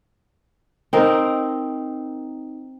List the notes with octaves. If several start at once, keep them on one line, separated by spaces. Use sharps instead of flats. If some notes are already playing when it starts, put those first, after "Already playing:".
C4 D#4 A#4